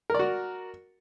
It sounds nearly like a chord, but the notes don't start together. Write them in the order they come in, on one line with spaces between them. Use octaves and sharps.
A#4 D5 F#4